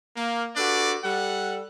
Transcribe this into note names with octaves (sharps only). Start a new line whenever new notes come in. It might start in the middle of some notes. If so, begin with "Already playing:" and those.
A#3
D4 F#4 G4 A4 B4 D5
G3 A4 F#5